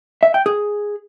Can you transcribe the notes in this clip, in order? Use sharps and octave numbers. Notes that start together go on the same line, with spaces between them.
E5
G5
G#4